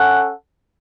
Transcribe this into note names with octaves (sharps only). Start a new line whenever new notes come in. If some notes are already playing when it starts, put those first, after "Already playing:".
Already playing: C#4 A4 F#5